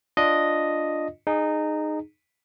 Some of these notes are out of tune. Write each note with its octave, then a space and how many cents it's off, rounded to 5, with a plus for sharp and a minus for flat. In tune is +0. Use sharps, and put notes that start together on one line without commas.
D4 +0 F4 +0 D#5 +0
D#4 -20 G#4 +0